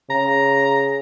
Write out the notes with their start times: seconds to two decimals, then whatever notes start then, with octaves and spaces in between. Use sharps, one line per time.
0.10 C#3 A#5